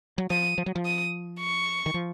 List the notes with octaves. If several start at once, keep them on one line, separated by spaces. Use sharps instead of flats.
F#3
F3 D#6
F3
F#3
F3
D#6
C#6
D#3
F3